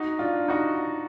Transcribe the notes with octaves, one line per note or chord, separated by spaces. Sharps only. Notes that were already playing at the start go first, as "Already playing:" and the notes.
Already playing: D#4 F#4
D4 F4
D#4 F#4